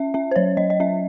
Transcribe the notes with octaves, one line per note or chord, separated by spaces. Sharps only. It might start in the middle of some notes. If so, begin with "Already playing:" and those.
Already playing: C#4 E5
C#4 E5
C5
F#3 C#5
F#3 D#5
D#5
C#4 E5